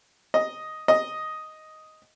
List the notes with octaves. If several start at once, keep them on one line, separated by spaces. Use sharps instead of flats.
D#5
D#5